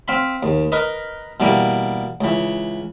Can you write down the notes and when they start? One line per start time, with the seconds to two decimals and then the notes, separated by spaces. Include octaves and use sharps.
0.08 C4 F5 B5
0.43 D#2
0.72 A#4 B4 D#5
1.40 B2 E3 G3 A#3
2.21 C#2 E3